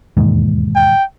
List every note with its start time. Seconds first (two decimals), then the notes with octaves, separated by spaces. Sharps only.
0.17 E1 D#2 G#2
0.75 G5